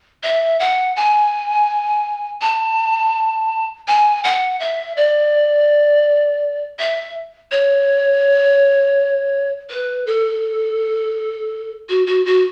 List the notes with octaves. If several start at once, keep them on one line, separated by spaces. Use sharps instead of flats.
E5
F#5
G#5
A5
G#5
F#5
E5
D5
E5
C#5
B4
A4
F#4
F#4
F#4